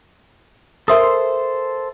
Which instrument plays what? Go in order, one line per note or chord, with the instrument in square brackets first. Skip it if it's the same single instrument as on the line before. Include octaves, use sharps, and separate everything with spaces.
[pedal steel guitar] A4 C5 C6 [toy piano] A#4 E5 D#6